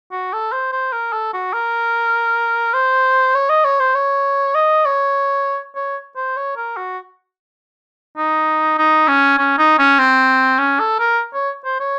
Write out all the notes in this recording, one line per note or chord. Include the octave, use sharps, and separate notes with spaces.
F#4
A4
C5
C5
A#4
A4
F#4
A#4
C5
C#5
D#5
C#5
C5
C#5
D#5
C#5
C#5
C5
C#5
A#4
F#4
D#4
D#4
C#4
C#4
D#4
C#4
C4
C#4
A4
A#4
C#5
C5
C#5